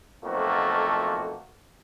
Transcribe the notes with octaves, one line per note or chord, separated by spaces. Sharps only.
B1 F2 F3 A3 A#3 F#4